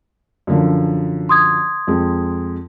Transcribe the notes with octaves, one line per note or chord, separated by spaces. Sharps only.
F#2 D3 F3
C6 D#6 G#6
F2 G#3